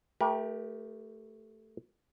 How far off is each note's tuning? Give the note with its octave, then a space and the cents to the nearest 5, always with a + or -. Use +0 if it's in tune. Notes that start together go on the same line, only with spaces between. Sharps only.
A3 +0 G4 +0 A#4 +45